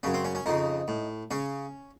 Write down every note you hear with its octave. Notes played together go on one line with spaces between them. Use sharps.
F#2 C#3 C#4
C4
C#4
C#4
F2 C#3 D#4
A2
C#3 C#4